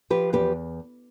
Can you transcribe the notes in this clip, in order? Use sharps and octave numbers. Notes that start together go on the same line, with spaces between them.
F3 G4 B4
E2 G4 B4